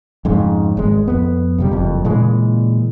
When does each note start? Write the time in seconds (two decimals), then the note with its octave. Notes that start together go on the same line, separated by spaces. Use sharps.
0.25 F2 G#2 C#3
0.77 G#1 G#3
1.07 F2 B3
1.58 F2 C3 G3
1.71 F#1 F2
2.05 A#2 C#3 E3 G#3